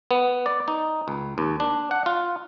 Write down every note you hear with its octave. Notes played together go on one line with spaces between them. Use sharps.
B3
D5
D#4
C#2
D#2
D4
F#5
F4